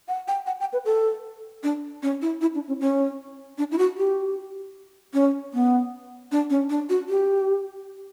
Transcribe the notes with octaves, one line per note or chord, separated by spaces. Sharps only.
F#5
G5
F#5
G5
B4
A4
D4
C#4
E4
E4
D4
C#4
C#4
D4
E4
F#4
G4
C#4
B3
D4
C#4
D4
F#4
G4